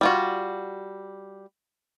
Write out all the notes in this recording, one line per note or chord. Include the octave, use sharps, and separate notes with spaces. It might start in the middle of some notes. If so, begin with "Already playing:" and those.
G3 F4 F#4